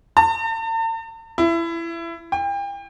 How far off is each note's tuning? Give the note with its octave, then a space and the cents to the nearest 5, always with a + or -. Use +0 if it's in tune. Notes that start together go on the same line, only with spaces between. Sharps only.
A5 +45
E4 +25
G5 +35